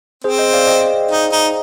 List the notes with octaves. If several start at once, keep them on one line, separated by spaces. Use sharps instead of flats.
C4 G#4 C5
C5 D#5
D5 F5
D#5 G5
D#4
D#4